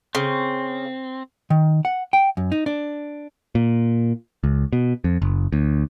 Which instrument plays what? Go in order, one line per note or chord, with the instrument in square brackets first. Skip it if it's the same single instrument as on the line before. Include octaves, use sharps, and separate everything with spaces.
[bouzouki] C#3 [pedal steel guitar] C4
[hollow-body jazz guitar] D#3
F#5
G5
F#2
D#4
D4
[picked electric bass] A#2
C#2
B2
F2
F#1
D2